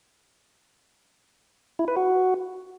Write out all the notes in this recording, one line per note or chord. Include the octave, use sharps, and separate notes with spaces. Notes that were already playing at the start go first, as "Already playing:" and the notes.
E4
B4
F#4